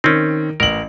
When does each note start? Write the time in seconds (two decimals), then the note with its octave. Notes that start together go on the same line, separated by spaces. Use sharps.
0.04 D#3 C4 C#4
0.60 A1 A#4 F#7